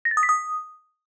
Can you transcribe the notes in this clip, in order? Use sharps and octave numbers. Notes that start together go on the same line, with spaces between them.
A#6
A6
D#6
B6
D#6